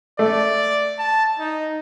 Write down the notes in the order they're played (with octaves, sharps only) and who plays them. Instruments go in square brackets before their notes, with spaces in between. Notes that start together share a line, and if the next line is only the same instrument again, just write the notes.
[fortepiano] A3 [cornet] D5
[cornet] A5
D#4